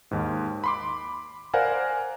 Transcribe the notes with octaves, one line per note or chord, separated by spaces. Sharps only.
D#2 G#2
B5 C6 D6
A#4 C5 D5 F5 F#5 G#5